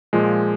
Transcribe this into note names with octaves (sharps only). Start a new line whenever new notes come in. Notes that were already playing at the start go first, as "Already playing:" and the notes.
A#2 F3 G#3